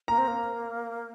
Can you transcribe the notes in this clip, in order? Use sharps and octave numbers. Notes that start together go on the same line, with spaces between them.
A#3 A#5
C4
A#3